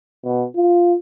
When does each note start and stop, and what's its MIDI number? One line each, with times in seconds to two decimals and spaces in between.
0.24 0.44 47
0.55 0.94 65